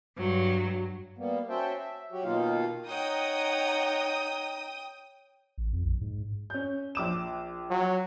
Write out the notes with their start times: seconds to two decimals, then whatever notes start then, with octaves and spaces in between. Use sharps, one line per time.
0.18 G2 F#3
1.18 G3 A#3 B3
1.49 C#4 F#4 C5 E5 G5 A5
1.78 E5
2.12 F#3 F#4 G4
2.24 B2 D#3 A#3 D#4 F4 F5
2.88 D#4 C#5 F#5 G5 A#5 D#6
5.58 A1
5.73 F2
5.85 A#1
6.01 G#2
6.50 C#4 G6
6.95 A#1 D6 E7
7.70 F#3